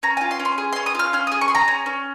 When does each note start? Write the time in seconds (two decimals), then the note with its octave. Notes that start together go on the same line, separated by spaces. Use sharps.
0.03 C#4 A#5
0.17 G#5
0.21 F4
0.31 C6
0.40 C#4
0.45 C6
0.58 G#4
0.73 C6
0.76 C#4
0.86 D#6
0.95 F4 F6
1.13 C#4 F6
1.27 D#6
1.32 G#4
1.41 C#6
1.48 G#4 C6
1.55 A#5
1.68 C#4
1.86 C#4